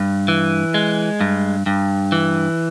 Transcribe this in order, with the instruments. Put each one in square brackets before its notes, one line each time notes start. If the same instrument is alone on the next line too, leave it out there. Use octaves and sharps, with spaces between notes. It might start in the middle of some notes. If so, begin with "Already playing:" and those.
Already playing: [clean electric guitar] G2
E3
G#3
G2
G2
E3